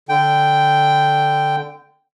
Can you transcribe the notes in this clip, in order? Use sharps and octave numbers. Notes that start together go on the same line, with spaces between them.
D3 G5